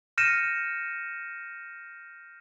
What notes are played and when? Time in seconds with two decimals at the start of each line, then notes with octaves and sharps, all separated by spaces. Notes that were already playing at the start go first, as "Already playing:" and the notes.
0.18 F6 G6 A#6 C#7 D#7 E7